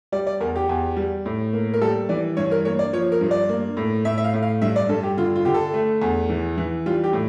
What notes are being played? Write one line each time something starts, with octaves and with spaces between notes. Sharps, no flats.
G3 D5
D5
E2 A#4
G4
E2
G3
A2
A#3
A#4
G3 A4
E3 D5
G2 C#5
A#4
A#3 C#5
D5
F3 C#5
A#4
G2
D5
A#3
A2
A2 E5
E5
F5
A2
F5
G2 E5
D5
G2 A4
G4
D3 F4
F4
D3 G4
A4
A3
E2
E3
E3
G3 F4
G4
A2